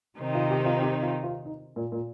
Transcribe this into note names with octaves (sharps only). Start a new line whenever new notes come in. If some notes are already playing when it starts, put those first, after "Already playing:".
C3 D#3 C4 D#4
F4
G4
F4
G4
F4
F4
D#4
A#2
A#2